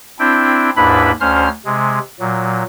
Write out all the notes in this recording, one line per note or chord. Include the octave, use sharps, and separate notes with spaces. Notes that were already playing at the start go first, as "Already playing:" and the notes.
C4 D4 E4 G5
D#2 G#2 D4 E4 B4 B5
D2 C#4 C5 F6
C3 G#3
A#2 F#3